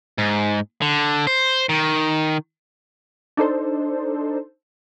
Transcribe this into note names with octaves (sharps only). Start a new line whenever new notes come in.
G#2
D3
C5
D#3
D4 D#4 A4 C5